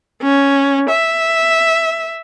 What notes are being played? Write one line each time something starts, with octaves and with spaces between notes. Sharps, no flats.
C#4
E5